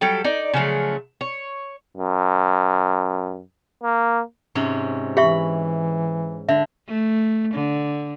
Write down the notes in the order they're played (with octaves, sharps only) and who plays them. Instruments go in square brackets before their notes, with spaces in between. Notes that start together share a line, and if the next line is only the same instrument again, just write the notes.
[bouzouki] F#3 G3 A4 G5
D#4 D5
C#3 F3 F#3 A3
C#5
[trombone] F#2
A#3
[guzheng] G#2 C3 C#4
[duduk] E3 [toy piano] G4 E5 C#6 [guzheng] B5
[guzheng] D3 [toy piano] E5
[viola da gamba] A3
D3